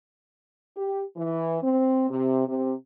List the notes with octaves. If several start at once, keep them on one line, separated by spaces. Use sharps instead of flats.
G4
E3
C4
C3
C3